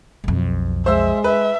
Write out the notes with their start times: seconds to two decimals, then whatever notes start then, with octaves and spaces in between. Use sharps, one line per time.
0.24 B1 F2
0.86 G#3 C5 E5 E6
1.24 B4 E5